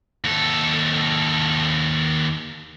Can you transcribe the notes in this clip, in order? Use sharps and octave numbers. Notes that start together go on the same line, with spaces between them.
D#2 A4